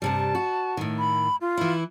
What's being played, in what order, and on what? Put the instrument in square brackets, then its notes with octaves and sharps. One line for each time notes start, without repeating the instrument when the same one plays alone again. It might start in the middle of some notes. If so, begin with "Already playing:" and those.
[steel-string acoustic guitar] G2 C3 G3 [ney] A5
[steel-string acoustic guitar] F#4
A2 D#3
[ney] B5
F4
[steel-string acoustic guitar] E3 E4